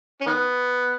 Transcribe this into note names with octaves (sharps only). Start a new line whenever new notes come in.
C#4
D#3 B3